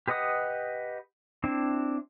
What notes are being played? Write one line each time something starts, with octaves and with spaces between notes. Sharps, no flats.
G4 B4 D#5 F#5 D#6
C4 D4 E4 G5